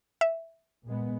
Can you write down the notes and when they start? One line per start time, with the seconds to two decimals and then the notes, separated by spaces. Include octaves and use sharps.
0.21 E5
0.86 A#2 G#3 B3